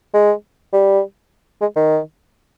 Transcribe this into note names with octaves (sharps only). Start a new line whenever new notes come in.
G#3
G3
G#3
D#3